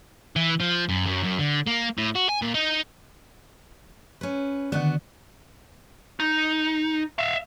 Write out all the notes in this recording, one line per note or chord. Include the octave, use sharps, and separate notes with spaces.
E3
F3
F#2
F#2
F#2
D3
A#3
A2
F#4
G#5
A#2
D#4
C#4 B4
D3 D#3 B3 D4 F#4
D#4
E5 F5